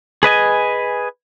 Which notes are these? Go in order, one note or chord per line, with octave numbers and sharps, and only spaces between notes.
G#4 B4 D#5 G#5